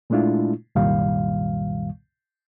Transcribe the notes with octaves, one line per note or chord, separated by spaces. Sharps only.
A#2 G#3 A3 D4 E4 F4
C2 F#2 A#2 D#3 G3 F5